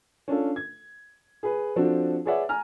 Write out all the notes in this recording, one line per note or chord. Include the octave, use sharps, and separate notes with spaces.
C#4 D4 F4 A4
G#6
G#4 B4
F3 C4 D4 F#4 A4
G#4 B4 C#5 D5 E5 F#5
G#5 A#5 F6